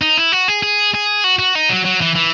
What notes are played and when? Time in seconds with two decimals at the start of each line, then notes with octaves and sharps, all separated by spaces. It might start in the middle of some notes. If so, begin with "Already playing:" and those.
0.01 D#4
0.18 E4
0.32 F#4
0.48 G#4
0.63 G#4
0.94 G#4
1.24 F#4
1.39 F#4
1.55 D#4
1.69 F#3
1.85 F#3
2.01 E3
2.15 E3